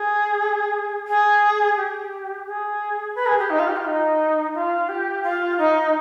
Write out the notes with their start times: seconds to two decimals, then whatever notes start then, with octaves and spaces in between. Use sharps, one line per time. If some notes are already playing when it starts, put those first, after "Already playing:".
Already playing: G#4
1.08 G#4
1.77 G4
2.46 G#4
3.15 B4
3.27 G#4
3.39 G4
3.50 D#4
3.59 F4
3.68 G4
3.76 F4
3.85 D#4
4.54 F4
4.89 G4
5.23 F4
5.58 D#4